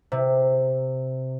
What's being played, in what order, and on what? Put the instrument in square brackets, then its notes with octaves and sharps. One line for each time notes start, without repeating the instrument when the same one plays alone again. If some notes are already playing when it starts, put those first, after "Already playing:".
[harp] C3